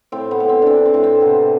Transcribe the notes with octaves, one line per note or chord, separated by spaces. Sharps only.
A2 C4
B3
A2
C4
E3 C4 D4
C4
A2
C4
C3 B3